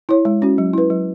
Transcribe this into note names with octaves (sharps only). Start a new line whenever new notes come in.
E4 C#5
G#3
C#4 F#4
F#3
E4 B4
F#3